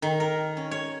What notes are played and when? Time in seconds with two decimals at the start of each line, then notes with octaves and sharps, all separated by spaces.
0.02 D#3
0.20 A#4
0.57 C#4
0.71 C#5